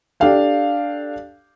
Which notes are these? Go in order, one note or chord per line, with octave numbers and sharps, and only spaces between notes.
D4 G4 A4 F5 G5